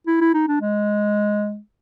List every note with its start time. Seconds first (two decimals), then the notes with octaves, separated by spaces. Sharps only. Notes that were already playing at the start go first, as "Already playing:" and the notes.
0.07 E4
0.21 E4
0.34 D#4
0.48 D4
0.62 G#3